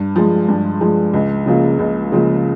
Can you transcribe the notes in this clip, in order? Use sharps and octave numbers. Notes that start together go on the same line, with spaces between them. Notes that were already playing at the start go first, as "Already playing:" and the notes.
Already playing: G2
F3 G#3
G2
F3 G#3
C#2
C#3 F3 A#3 F4
C#2
C#3 F3 A#3 F4